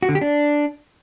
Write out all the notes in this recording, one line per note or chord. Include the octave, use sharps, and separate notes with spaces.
F#4
D3
G4
D4